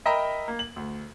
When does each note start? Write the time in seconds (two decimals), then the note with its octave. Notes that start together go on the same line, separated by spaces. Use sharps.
0.05 A#4 D#5 E5 G5 A#5 B5
0.48 A#3
0.59 F#7
0.76 D2